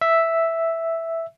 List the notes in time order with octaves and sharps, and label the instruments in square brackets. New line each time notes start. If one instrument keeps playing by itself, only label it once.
[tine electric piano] E5